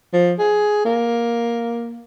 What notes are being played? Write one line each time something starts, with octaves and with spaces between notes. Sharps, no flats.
F3
G#4
A#3